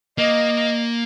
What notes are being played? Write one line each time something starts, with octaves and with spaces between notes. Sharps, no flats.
A#3 D#5